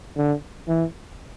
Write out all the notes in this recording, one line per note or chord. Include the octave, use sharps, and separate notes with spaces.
D3
E3